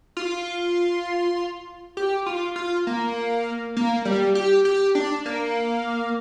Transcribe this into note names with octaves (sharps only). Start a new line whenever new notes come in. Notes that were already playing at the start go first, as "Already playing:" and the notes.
F4
G4
F4
F4
A#3
A#3
G3
G4
G4
D4
A#3